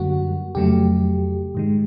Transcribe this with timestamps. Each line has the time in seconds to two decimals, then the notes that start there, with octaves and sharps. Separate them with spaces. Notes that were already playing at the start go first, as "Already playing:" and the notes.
Already playing: F#2 D3 G3 A#3 F#4
0.55 F2 C#3 F#3 A3 G4
1.55 G#2 D#3 G#3